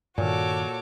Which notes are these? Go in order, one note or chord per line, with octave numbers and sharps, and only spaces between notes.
G2 A#2 D#3 F#4 A4 C#5 D6